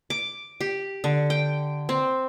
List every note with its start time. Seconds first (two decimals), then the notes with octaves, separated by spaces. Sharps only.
0.10 D6
0.61 G4
1.04 D3
1.30 G5
1.89 C4